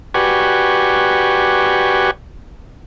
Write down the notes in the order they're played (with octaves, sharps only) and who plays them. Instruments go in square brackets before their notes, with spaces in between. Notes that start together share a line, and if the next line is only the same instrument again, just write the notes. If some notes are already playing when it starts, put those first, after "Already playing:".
[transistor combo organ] F#4 G4 B4 D5 G#5 C#6